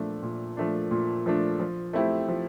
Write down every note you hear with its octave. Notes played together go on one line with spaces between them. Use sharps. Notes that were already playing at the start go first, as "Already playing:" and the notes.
Already playing: A#2 F3 A3 D4
A#2
F3 A3 D4
A#2
F3 A3 D4
F3
A3 C4 E4 G4
F3